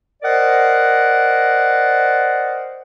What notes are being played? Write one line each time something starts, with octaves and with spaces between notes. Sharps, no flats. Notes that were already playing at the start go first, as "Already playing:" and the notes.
A#4 C5 D5 D#5 F#5